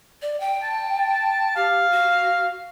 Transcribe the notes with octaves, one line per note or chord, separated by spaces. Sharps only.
D5
G5
A5
G4 F5
F#4